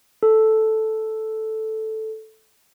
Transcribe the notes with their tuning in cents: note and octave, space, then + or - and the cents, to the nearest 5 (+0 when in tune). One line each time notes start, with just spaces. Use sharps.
A4 -5